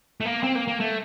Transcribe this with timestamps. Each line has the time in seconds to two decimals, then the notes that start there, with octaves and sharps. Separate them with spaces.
0.21 A3
0.25 A#3
0.43 C4
0.55 A#3
0.68 A#3
0.80 A3